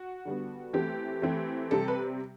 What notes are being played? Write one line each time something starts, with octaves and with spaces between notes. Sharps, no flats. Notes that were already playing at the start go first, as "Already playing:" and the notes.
Already playing: F#4
D3 G3 B3
E3 A3 C4 G4
E3 A3 C4
C3 G3 C4 A4
B4